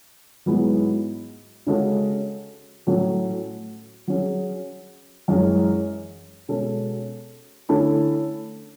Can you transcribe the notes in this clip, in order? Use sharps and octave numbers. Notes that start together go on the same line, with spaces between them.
G#2 F#3 B3 E4 G#4
C#3 G#3 C#4 F#4 A4
A2 F#3 A3 C#4
F#3 C#4 G#4
F#2 E3 G#3 C#4
B2 G#3 C#4 F#4 A4
D3 A3 C#4 E4 A4